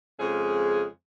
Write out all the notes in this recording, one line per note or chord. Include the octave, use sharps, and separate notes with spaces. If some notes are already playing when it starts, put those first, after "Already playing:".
F2 C#3 G#3 G#4